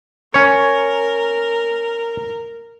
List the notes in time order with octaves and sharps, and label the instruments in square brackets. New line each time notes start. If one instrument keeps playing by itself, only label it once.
[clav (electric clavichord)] C#4 C#5 [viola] A#4